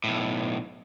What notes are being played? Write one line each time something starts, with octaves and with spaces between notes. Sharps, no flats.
B1 A2